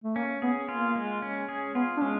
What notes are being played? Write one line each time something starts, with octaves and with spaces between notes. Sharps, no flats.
A3
A#3 C#4
B3 G#4
A#3 F4
G#3
C#4
G#4
B3 F4
D4
G#3 C#4